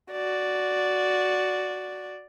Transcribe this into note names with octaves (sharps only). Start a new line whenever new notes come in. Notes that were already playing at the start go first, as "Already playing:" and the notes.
F#4 D5